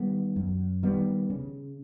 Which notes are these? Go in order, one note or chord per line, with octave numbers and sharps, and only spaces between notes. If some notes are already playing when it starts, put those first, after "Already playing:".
Already playing: D#3 G3 B3
F#2
D#3 G3 B3
C#3